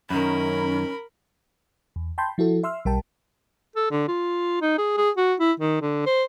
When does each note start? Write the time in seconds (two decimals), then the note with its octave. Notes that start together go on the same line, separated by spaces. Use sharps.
0.10 F#2 D#3 C#4 A#4 B5
1.96 E2
2.18 G5 A5 B5 C6 G6
2.38 F3 E4 F#4 A4
2.63 E5 C6 E6 F6
2.85 B1 G3 A#4 G5 A5
3.76 A4
3.91 D3
4.08 F4
4.62 D#4
4.78 G#4
4.97 G#4
5.17 F#4
5.40 E4
5.60 D#3
5.81 D3
6.06 C5